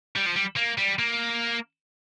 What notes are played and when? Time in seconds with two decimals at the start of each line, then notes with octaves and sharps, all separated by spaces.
0.16 G3
0.26 F3
0.36 G3
0.57 A#3
0.78 G3
0.99 A#3